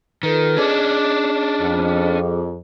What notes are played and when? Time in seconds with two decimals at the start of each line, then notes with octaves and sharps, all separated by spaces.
0.23 D#3 F4 A4 B4
0.57 C#4 D4 G#4 D#5 D6
1.61 F2